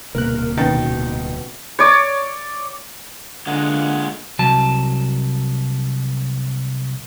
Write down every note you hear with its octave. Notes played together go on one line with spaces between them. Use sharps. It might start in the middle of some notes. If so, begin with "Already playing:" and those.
D1 C2 B2 A#3 A#4 F#6
B2 D#3 B3 C#4 A6
C#5 D5
D3 G#3 A#3 F4 F#5
C2 F#3 A5